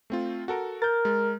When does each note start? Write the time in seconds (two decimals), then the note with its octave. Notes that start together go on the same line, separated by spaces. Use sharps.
0.10 A3 C4 F4
0.48 F#4 A4 A#4
0.82 A#4 G6 A6
1.05 G#3